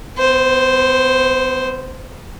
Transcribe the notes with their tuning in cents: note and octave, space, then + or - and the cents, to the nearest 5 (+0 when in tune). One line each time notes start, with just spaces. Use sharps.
B3 +35 C5 +0